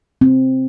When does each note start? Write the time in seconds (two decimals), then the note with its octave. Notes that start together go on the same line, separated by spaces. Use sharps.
0.21 C4